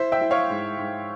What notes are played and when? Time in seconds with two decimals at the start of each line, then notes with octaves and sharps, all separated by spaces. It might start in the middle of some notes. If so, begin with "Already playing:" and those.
Already playing: E4 C5 E5
0.12 E5 G5
0.21 E4
0.31 C#5 F5
0.50 G#2
0.78 G#2